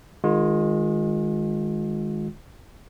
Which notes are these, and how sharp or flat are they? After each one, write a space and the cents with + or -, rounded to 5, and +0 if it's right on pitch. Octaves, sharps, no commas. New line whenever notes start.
D#3 -5 G#3 +0 F4 +45